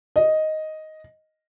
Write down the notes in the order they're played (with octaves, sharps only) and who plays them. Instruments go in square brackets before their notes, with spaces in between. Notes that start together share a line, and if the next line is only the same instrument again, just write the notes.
[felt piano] D#5